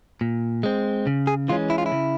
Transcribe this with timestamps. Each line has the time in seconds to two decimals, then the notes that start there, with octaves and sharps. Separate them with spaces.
0.21 A#2
0.63 G#3 C4
1.07 C#3
1.27 G#4
1.48 E3 G#3 C#4 F4
1.70 E4
1.78 F4
1.86 E4
1.92 C#3